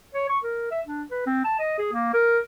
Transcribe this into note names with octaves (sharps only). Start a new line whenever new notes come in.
C#5
C#6
A#4
E5
D4
B4
C4
A5
D#5
G#4
A#3
A#4